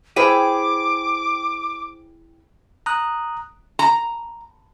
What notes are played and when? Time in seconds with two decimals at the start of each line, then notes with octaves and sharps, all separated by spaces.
0.16 E4 G#4 B4 C5 G5 D6 D#7
2.86 A#5 D#6 F#6
3.79 A#5